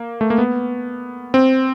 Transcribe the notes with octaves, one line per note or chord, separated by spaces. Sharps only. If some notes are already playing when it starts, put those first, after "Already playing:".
Already playing: A#3
A3
A#3
B3
C4